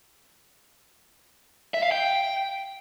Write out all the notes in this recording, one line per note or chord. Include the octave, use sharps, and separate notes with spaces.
E5
F5
G5